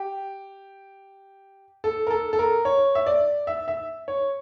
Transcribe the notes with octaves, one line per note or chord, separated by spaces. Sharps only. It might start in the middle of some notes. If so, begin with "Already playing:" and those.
Already playing: G4
A4
A#4
A4
A4
A#4
C#5
E5
D5
E5
E5
C#5